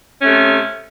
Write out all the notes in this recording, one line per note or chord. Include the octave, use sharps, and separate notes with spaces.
C3 A3 C#4